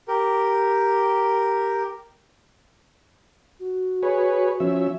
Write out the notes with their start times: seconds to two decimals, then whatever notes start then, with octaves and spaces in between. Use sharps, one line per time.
0.08 G4 A#4
3.60 F#4
4.03 G#4 B4 C#5
4.60 F3 C#4 E5